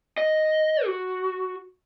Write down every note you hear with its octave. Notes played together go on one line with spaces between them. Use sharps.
D#5
F#4